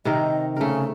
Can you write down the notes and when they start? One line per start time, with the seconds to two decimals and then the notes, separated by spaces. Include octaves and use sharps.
0.05 C3 D#3 A#4 D#5
0.57 C#3 A3 A#4